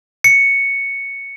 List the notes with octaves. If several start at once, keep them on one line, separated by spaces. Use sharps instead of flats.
C#7